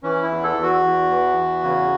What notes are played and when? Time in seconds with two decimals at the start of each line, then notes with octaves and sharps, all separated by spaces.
0.03 E3 C#4
0.23 E4
0.30 E2
0.44 A4
0.57 E2
0.63 F#4
0.83 E2
1.10 E3
1.37 E2
1.63 C#3